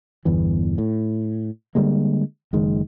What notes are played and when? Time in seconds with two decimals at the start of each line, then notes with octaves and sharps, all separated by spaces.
0.25 G1 E2 E3
0.78 A2
1.75 D3 G3 G#3 A#3
2.53 F#1 D#3 G#3